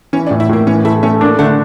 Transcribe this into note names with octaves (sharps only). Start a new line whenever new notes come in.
E3 C#4
D4
A2
E4
A2 A#3
E3 C#4
A3 E4
A3 C#4
A#3 D4
D3 A3